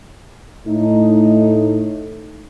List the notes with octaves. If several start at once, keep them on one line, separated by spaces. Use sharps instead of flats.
A2 A3 D#4